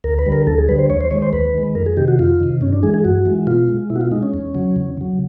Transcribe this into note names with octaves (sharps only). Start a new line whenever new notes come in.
D2 A#4
B4
D3 G3
A#4
D2 A4
G#4
D3 G3 B4
C5
D#2 C#5
C5
D#3 G#3 C#5
C5
D#2 B4
D#3 G#3
F2 A#4
G#4
C3 D#3 G4
F#4
F2 F4
C3 D#3
G2 C#4
D4
E3 G#3 G#4
G#4
G2 F#4
E3 G#3
B2 F4
G#3
B2 E4
F#4
F4
G#3 D#4
C#4
E2
C#3 F#3
E2
C#3 F#3